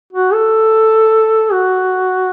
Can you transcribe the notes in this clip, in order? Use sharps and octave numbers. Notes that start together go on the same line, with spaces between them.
F#4
A4
F#4